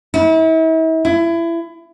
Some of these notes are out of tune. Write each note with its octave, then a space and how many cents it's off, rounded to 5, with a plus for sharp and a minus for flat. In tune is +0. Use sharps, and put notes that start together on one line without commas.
E4 -40
E4 +25